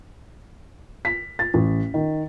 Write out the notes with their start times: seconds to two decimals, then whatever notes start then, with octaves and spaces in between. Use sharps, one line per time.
1.05 B6
1.39 A6
1.54 A1
1.94 D#3